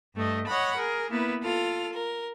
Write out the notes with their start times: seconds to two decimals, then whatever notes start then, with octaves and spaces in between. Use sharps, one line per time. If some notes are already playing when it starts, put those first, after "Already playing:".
0.15 G2 A3 D#5
0.47 C#5 D#5 F#5 B5
0.76 G#4 A#4
1.10 A#3 B3 E4 B4
1.42 F4 A4 F6
1.93 A#4